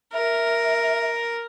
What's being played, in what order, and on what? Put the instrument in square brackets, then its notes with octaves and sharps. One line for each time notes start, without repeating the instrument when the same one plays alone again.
[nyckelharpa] A#4 [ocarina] E5